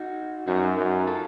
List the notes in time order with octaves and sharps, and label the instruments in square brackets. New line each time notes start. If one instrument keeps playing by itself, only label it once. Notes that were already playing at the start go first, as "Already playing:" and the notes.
Already playing: [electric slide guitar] D#4 F#4
[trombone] F#2 [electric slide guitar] D#4 F#4
[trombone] F#2
[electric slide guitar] A#4
F4 A4